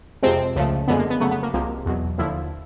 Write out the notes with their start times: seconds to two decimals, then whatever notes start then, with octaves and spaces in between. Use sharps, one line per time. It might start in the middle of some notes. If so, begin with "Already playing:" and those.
0.23 F2 C3 F3 G#3 C4
0.56 C#2 C#3 F3 A3
0.88 F#2 D3 F3 G#3 B3
0.99 A#3
1.10 B3
1.20 F2 C#3 F#3 A3 B3
1.31 B3
1.43 A#3
1.53 C2 C3 F3 G#3 A#3
1.86 E2 B2 F#3
2.18 D#2 D3 F3 E4